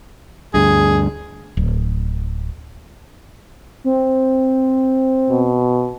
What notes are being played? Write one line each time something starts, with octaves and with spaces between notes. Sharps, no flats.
D2 G2 G#4
D1
C4
B2